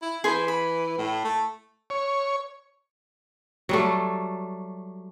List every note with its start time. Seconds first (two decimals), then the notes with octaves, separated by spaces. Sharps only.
0.02 E4
0.24 E3 G#4 C5 B5
0.48 B5
0.98 A2
1.24 A3
1.90 C#5
3.69 F#3 G3 A3